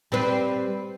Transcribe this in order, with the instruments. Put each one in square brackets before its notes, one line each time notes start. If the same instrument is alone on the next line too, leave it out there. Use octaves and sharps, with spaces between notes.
[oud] G3 C4 B4